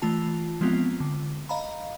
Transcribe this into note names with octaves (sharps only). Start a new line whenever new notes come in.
E3 A3 F4 A5
F3 G#3 B3 C4 F4
D3
D#5 F5 A#5 B5